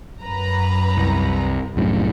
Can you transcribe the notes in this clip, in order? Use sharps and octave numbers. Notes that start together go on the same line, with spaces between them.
F#2 B4 A#5
C2
C2 F#2 A2